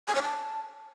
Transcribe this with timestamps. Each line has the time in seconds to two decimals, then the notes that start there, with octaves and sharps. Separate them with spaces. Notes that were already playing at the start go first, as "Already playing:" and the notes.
0.08 G#5
0.15 C#5
0.22 A5